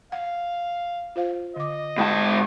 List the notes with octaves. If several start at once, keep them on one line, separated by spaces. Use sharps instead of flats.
F5 F#5
F4 C5 F5
D3 D#5 D6
G#2 F5 G5 A5 B5